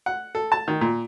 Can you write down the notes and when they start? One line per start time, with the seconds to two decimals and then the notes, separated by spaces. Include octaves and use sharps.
0.06 F#5
0.35 A4
0.52 A5
0.68 D#3
0.81 A#2